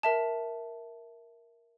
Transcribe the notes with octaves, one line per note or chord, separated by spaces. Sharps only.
A#4 E5 A5